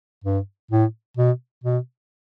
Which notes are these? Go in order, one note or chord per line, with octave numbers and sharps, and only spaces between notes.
G2
A2
B2
B2